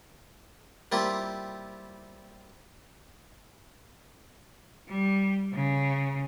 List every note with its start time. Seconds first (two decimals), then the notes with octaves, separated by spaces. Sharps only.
0.92 G3 A#3 C4 E4 F4
4.88 G3
5.53 C#3